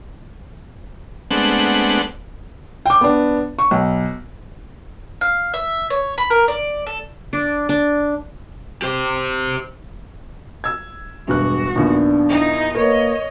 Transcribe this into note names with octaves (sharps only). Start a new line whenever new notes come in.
G#3 A3 B3 C4 D4 F#5
G5 D6
B3 D4
C#6
B1
F5
E5
C#5
B5
A#4
D5
A4
D4
D4
G4 C5
E6 G#6
E1 G2 F#4 F#6
A#1 D#2 B3 D4
D#4 E4
A#3 A#4 B4 C#5 D#5